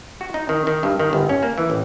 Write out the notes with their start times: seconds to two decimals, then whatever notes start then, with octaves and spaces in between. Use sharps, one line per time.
0.21 F#4
0.34 D#4
0.49 D#3
0.67 D#3
0.83 G2
1.00 D#3
1.13 G1
1.29 C#4
1.43 A#3
1.58 E3
1.70 A1